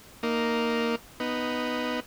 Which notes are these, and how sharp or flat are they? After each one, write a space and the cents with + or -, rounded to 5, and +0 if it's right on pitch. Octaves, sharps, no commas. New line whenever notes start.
A#3 +0 D#4 +0
B3 +0 D#4 +0